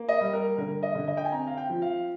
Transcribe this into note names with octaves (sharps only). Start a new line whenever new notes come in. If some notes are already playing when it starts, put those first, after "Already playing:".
Already playing: A#3
D#5
G3
A#4
D3 A#4
D#5
D3
D#5
G5
G#5
C4 A#5
F5
G5
F3
F5